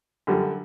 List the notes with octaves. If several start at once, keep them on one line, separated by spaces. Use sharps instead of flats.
F#2 D3 G3